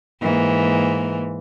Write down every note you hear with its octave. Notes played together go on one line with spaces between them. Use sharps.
G#2 E3 A#3